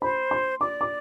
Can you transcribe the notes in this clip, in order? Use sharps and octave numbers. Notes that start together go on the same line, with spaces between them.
C5 B5
C6
D5 D6
D6